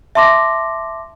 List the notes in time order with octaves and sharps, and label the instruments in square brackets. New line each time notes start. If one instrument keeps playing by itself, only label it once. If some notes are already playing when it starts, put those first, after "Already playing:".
[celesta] E5 A5 C6 D6 A#6